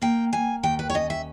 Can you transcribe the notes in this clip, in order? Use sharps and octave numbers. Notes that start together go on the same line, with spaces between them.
A#3 G5
A#3 G#5
D#2 G5
B4
C#5
C#4 D#5
E5